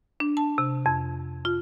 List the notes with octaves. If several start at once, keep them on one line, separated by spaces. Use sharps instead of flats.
D4
A5
C3
F2
F4